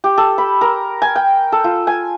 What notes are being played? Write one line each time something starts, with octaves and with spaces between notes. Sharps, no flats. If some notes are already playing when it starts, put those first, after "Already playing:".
G4
A4
B5
A#4
G#5
G5
A4
F4
G#5